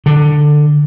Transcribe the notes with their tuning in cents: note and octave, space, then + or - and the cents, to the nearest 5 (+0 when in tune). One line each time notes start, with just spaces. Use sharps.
D3 +10